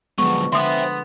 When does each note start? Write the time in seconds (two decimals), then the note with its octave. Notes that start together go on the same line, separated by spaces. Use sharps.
0.18 D3 F3 F#3 G#3 B3 C#6
0.53 D3 B3 C5 E5 C6 D#6